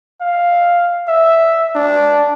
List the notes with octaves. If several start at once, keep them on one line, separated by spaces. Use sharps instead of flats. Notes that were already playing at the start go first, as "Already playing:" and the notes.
F5
E5
D4